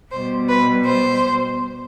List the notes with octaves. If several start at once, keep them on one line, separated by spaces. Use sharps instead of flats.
B2 G3 C5
B4
C5